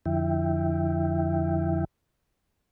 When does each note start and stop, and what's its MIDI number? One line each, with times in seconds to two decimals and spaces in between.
0.06 1.85 41
0.06 1.85 50
0.06 1.85 53
0.06 1.85 64
0.06 1.85 76
0.06 1.85 79